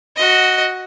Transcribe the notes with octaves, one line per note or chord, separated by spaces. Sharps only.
F#4 D#5